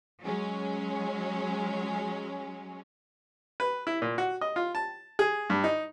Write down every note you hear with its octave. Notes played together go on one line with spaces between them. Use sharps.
F#3 G#3 C#4
B4
E4
A#2
F#4
D#5
F4
A5
G#4
G2
D#4